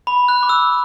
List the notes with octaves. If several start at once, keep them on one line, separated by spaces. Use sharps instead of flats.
B5
F#6
D6
E6